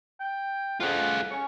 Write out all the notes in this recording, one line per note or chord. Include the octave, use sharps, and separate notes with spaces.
G5
F2 F4 G#4 F#5
C#4 C#6